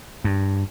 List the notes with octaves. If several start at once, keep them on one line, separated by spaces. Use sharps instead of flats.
G2